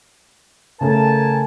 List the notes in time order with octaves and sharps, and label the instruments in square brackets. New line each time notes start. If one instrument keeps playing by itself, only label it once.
[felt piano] C#3 A3 [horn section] A#4 G#5 A5